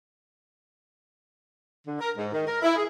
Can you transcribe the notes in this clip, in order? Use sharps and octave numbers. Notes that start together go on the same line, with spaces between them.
D3
A#4
G#2
D#3
A#4
E4
G#4